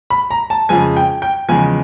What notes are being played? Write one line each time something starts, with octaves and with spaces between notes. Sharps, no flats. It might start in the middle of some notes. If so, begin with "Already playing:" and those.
B5
A#5
A5
F2 C#3 F3 G#3 G#5
G5
G5
E2 C#3 F3 G#3 G#5